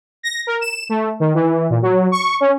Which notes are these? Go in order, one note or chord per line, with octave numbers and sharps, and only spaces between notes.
A#6
A#4
E7
A3
D#3
E3
A#2
F#3
C#6
C#4